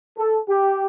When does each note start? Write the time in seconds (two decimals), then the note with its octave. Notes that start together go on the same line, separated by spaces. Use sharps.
0.18 A4
0.49 G4